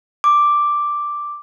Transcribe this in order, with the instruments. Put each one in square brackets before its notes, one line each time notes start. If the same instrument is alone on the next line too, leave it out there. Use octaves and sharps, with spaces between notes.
[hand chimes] D6